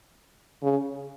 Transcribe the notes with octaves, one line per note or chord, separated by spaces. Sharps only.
C#3